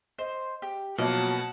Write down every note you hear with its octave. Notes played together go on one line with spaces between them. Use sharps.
C5 D#5
G4
B2 F3 F#3 A#3 C#5 F#5 A5